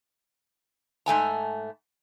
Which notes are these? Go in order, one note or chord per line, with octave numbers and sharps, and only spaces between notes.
G#2 A3 G#5 A#5